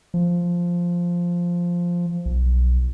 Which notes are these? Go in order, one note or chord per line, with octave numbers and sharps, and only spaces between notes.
F3
B1